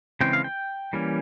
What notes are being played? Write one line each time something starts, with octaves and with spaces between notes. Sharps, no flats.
C#3 E3 G#3 C4 G5
F5
G5
E3 G3 A#3 C#4